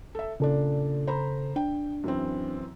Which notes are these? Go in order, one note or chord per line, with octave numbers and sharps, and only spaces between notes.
A4 E5
A#2 C#3 D4 A4
C5 A#5 B5
D4 G5
F#2 E3 C4